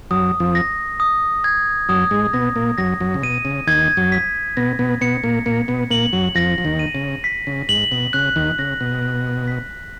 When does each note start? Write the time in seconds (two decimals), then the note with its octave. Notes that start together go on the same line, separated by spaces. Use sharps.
0.11 F#2 F#3 D#6
0.40 F2 F3
0.55 A#6
1.00 D#6
1.44 G#6
1.89 F#2 F#3 D#6
2.11 G#2 G#3
2.33 B2 B3 A#6
2.56 A#2 A#3
2.78 F#2 F#3 A#6
3.00 F#2 F#3
3.14 C#3
3.23 B2 D#7
3.45 C#3
3.67 D#2 D#3 G#6
3.97 F#2 F#3
4.12 B6
4.57 B2 B3 A#6
4.79 B2 B3
5.01 B2 B3 C#7
5.24 A#2 A#3
5.46 A#2 A#3 C#7
5.68 B2 B3
5.90 A#2 A#3 F#7
6.13 F#2 F#3
6.35 F2 F3 A#6
6.58 F3
6.65 D#2 D#3
6.79 D#7
6.95 C#3
7.24 B6
7.47 C#3
7.69 G#2 F#7
7.91 B2
8.13 C#3 F#6
8.36 D#2 D#3
8.58 C#3 A#6
8.81 B2
9.03 F#6
9.48 B6